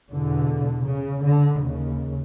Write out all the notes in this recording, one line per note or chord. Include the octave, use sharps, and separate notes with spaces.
E2 B2 D3
C#3
D3
D#2 C#3